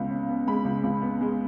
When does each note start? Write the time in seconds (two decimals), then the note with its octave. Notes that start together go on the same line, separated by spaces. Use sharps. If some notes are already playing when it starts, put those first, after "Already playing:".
Already playing: C#2 B3
0.10 C#3
0.29 B3
0.47 G#3 B5
0.65 C#2
0.83 C#2
1.02 B3
1.21 G#3